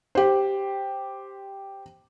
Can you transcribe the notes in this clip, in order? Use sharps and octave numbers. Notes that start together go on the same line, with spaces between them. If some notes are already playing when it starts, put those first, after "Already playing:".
G4 C5